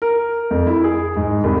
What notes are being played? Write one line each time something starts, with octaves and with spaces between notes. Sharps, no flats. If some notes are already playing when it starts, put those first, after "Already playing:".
A#4
F2
E4
G#4
G#2
C2